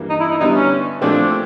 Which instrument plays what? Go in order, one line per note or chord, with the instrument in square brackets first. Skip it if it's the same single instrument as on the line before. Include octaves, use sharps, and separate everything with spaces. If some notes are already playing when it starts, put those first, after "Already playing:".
Already playing: [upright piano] G2 E3 G3 A#3
[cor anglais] D#4
E4
D#4
[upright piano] D3 G3 B3 E4 [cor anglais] D#4
[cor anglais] C#4
[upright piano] A#2 F3 A3 C4 [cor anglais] D4